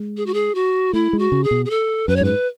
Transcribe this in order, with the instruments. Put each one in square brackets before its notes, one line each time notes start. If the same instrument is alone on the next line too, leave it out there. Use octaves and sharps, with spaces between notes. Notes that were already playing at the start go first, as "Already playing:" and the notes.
Already playing: [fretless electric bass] G#3
[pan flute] G#4
F#4
G#4
F#4
[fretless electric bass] A3 [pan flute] E4
[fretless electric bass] G#3
[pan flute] F#4
[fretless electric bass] C#3
[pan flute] G#4
[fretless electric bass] B2
[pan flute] G#4
A4
[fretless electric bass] F#2 [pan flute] B4
[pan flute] C#5
[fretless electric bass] G#2 [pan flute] B4